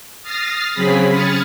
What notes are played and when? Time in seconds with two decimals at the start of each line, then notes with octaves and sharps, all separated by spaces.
0.22 D#6 F6 A6 A#6 C7
0.73 C#3 F#3 C4 G#4 B5 B6
1.10 B5 D#6 F6 G#6 A6 C#7